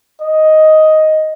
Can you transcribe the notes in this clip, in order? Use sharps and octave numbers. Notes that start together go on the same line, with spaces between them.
D#5